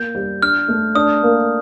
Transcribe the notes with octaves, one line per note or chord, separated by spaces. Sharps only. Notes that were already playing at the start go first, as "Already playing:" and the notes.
Already playing: A#3 G6
G3
D4 F6
A3
D4 D#6
A#3